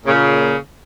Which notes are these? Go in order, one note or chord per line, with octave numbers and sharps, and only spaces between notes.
A#2 C#3